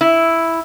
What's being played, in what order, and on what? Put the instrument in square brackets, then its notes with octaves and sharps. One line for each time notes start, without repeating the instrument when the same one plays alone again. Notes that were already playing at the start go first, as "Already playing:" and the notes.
[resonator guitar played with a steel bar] E4